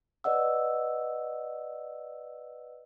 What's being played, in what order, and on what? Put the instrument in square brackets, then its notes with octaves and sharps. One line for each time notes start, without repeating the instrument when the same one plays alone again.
[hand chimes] B4 D5 D#5 F#5 E6